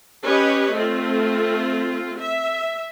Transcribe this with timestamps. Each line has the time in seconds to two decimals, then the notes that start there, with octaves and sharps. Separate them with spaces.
0.26 C#4 G4 B4 C#5 D#5
0.73 A3 C4 F4
2.20 E5